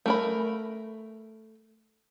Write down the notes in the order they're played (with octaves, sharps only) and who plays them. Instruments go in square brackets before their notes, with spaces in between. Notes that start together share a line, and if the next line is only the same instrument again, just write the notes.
[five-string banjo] A3 A#4 B5